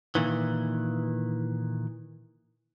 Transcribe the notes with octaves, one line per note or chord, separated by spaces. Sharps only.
A#2 D#3 E3